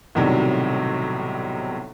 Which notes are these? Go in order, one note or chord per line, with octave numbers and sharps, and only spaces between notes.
B1 A2 C3 D#3 F#3 G3